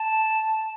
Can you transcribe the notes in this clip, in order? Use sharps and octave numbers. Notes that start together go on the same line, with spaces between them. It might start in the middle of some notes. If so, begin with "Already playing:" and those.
Already playing: A5